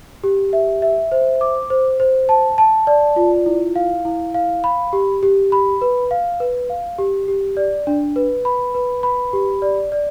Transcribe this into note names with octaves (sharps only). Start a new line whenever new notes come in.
G4
E5
E5
C5
D6
C5
C5
A5
A5
D5
F4
E4
F5
E4
F5
B5
G4
G4
B5
B4
F5
B4
F5
G4
G4
D5
D4
B4
B5
B4
B5
G4
D5
D5